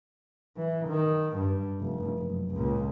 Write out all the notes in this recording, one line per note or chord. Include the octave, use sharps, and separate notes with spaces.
E3
D#3
G2
F1
F#1
C#2 A#2